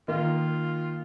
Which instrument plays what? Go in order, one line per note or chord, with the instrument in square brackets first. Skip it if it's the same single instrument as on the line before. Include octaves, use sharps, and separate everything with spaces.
[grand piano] D#3 A#3 [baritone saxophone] F4